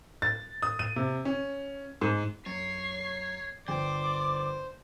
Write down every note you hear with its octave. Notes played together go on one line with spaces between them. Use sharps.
A6
D#6
D#7
C3
C#4
G#2
F#2 C#5 C7
G1 C5 D5 G5 D6